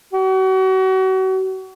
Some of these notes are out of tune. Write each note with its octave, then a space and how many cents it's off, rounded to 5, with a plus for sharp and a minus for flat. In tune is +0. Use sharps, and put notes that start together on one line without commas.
F#4 +35